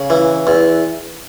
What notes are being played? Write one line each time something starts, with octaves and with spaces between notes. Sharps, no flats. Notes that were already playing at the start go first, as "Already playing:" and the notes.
Already playing: C#3
E3
E2